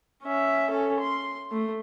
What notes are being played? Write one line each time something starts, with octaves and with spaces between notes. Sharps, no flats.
C#4 E5
C#4 A4
C6
A3